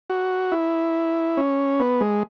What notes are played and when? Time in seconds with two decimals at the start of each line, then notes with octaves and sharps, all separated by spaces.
0.10 F#4
0.52 E4
1.37 C#4
1.80 B3
2.01 G#3